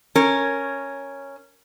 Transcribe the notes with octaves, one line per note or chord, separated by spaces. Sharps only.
C#4 A#4